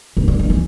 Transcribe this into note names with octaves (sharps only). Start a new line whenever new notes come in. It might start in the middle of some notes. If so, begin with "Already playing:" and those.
C#3
D3
D#3
E3